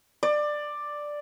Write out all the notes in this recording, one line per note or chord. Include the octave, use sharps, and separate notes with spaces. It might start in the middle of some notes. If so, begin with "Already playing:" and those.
D5